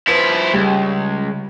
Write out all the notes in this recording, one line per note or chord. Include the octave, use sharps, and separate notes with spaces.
F3 E4 B4
C#2 G3